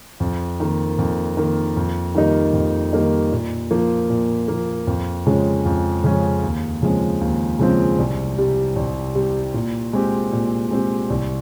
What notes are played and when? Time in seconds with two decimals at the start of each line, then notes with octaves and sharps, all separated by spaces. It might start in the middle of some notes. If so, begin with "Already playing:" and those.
0.20 F2
0.60 D#3 A#3
0.99 F2
1.37 D#3 A#3
1.77 F2
2.15 D#3 G3 A#3 D#4
2.54 F2
2.93 D#3 G3 A#3 D#4
3.32 A#2
3.71 F3 A#3
4.10 A#2
4.48 F3 A#3
4.87 F2
5.26 C#3 F3 G#3 C#4
5.65 F2
6.04 C#3 F3 G#3 C#4
6.43 D#2
6.82 C#3 F3 G#3 C4
7.21 D#2
7.59 C#3 F3 G#3 C4
7.98 C2
8.38 C3 G3
8.76 C2
9.15 C3 G3
9.54 A#2
9.93 G#3 C4 G4
10.32 A#2
10.71 G#3 C4 G4
11.10 C2